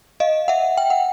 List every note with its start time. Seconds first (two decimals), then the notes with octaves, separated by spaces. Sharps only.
0.20 D#5 F5
0.48 E5 F#5
0.77 G5
0.90 F#5